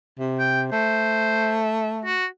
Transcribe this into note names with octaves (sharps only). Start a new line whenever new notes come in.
C3
G5
A3 C5
F#4